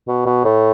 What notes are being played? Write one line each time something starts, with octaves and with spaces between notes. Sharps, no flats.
B2
B2
A2